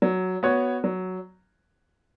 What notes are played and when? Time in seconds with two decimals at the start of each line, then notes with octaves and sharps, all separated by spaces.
0.02 F#3
0.43 B3 F#4 C#5
0.84 F#3